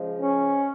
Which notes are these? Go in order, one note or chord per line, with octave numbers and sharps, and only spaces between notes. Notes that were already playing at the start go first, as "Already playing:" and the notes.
Already playing: C#3 F3 G#3
C#4